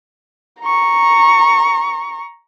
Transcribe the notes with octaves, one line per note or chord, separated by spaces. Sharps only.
A#5 C#6